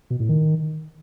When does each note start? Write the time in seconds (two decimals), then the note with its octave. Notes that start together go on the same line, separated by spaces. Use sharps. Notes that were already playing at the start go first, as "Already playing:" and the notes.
0.10 B2
0.20 A2
0.29 D#3